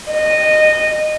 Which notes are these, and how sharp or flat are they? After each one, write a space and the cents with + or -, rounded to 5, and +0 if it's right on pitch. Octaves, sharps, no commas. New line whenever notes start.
D#5 -15